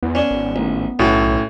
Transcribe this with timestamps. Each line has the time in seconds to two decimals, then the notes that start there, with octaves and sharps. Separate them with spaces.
0.03 E2 B3
0.15 C#4 D4
0.31 G#1
0.56 A1
0.99 B1 A2 C#4 F#4 A4